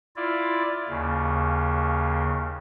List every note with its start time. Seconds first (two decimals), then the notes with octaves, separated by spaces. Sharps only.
0.16 E4 F4 D5
0.89 D#2 C#3